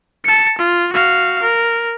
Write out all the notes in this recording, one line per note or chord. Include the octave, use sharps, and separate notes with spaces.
A5 C#7
F4
F#4 F5
A#4